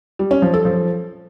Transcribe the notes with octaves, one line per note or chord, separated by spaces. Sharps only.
G3
C#4
F3
A4
F3